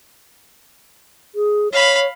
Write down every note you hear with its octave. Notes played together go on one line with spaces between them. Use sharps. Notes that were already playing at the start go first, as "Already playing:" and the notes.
G#4
C#5 F5 B5